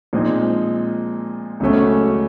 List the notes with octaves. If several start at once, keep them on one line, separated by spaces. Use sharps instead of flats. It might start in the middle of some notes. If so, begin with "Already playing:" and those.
A#2 F3 G#3 C4 D#4
C#2 C#3 F#3 A3 C#4